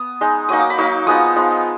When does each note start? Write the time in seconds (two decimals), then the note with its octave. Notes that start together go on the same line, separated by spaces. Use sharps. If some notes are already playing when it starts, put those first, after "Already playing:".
Already playing: B3 D#6
0.21 G#3 D#4
0.49 F#3 A#3 D#4 D#6
0.60 D6
0.70 B5
0.78 F#3 A#3 D#4 D6
1.06 F3 G#3 B3 D#4 D#6
1.36 F3 G#3 B3 D#4